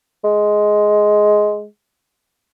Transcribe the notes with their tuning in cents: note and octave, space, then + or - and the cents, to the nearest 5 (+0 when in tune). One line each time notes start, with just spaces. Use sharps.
G#3 +10